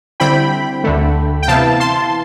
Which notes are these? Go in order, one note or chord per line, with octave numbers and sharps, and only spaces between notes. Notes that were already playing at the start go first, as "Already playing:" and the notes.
D3 G3 C4 E4 G5 B5
D2 D3 A3
G5
C3 E3 B3 E4 F5 A5
A5 C6